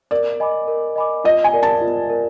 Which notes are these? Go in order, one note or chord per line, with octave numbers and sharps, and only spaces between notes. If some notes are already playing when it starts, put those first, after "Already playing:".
A#4 D5
D#5 G#5 B5 D6
A#4
D#5 G#5 B5 D6
F4 D#5
G#5
A#4 D5
A5
F4
A#4 D5